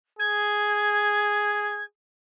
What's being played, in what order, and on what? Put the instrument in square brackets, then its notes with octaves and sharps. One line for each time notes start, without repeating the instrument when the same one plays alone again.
[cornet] G#4 [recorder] G#6